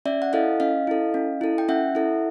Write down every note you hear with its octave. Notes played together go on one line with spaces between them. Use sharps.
C#4 D5 E5
F#5
E4 A4 D#5 F5
C#4 D#5 F5
E4 A4
C#4
E4 A4
G5
C#4 E5 F#5
E4 A4